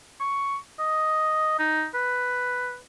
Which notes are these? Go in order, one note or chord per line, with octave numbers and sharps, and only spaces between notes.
C#6
D#5
D#4
B4